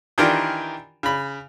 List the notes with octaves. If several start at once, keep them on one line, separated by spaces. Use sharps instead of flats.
D#3 E3 D4 F4 G4 A#4
C#3 B5